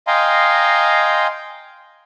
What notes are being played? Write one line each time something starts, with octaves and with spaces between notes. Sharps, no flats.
D#5 F5 G5 G#5 A#5 C6